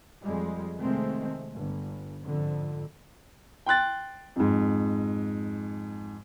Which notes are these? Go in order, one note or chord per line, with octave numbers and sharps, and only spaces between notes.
F2 G3 G#3
C3 D#3 G#3 A3 C4
G1
F2 G#2 D3
G5 C6 F#6 A6
F2 G#2